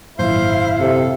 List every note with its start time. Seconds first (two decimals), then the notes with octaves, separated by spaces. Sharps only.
0.19 G#1 F#2 A#2 E4 C5 F5
0.80 C3 A4